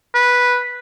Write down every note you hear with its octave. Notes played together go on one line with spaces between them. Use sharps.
B4